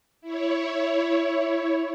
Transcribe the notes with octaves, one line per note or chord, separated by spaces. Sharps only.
E4 C#5